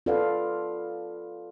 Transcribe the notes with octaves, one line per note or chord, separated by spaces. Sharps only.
F4 A4 B4 D5 F5 F#5